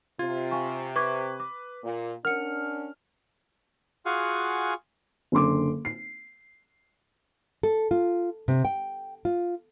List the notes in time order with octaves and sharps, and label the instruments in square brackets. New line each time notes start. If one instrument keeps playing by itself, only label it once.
[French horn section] C3 [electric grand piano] F4 [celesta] G#6
[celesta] F5 G#5 C#6
[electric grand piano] B4 [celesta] C#6 D6 G#6
[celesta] D6
[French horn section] A#2
[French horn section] C#4 D4 [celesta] A#4 F#5 C#7 [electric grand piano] F6
[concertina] F4 F#4 G#4 F5 F#5 G#5
[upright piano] F#1 D3 C6 D6
C7
[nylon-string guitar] A4
F4
C3
G5
F4